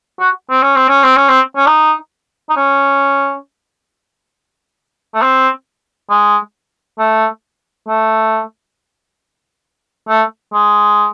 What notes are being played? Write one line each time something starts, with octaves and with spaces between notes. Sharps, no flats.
F#4
C4
C#4
C4
C#4
C4
C#4
C4
C#4
D#4
D#4
C#4
A3
C4
G#3
A3
A3
A3
G#3